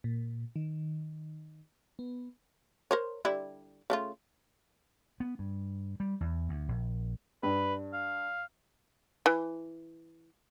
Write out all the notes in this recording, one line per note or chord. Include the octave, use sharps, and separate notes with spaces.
A#2
D#3
B3
A#4 C5 C#5
D3 G3 E4
C#3 A3 F4
B3
G2
G3
E2
D2
A#1
G2 B4
F5
E3